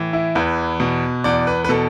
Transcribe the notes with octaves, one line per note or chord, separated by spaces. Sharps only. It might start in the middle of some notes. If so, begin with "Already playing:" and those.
Already playing: A2 E3
E4
E2 B4
B2
E2 D5
B4
B4
B2 A4